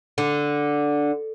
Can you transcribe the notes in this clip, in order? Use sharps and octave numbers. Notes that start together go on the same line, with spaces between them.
D3